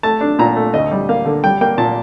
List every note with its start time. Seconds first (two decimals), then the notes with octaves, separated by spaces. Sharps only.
0.03 A3 A5
0.21 D4
0.39 A#2 A#5
0.56 A3
0.74 D2 D#5
0.91 G3
1.09 A#3 F5
1.25 D3
1.44 G3 G5
1.61 A#3 G5
1.78 A#2 A5